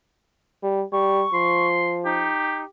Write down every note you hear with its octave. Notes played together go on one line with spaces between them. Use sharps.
G3
G3 C#6
F3 C6
D#4 G4